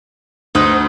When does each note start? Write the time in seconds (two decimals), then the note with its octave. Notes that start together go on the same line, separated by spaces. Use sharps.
0.55 D2 D#4 B4 C5